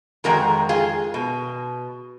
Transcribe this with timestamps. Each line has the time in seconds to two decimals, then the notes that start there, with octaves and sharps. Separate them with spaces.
0.24 F2 D#3 G#3 F#4 A#4
0.69 F4 G#4
1.14 B2